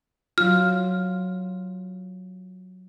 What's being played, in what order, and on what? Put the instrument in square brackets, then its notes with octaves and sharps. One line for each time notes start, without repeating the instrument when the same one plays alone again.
[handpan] F#3 F4 [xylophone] F6